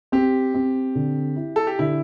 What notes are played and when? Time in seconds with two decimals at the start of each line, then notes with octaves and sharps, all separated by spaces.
0.12 C4 G4
0.54 C4
0.95 D3
1.36 E4
1.56 A4
1.67 G4
1.79 D3 E4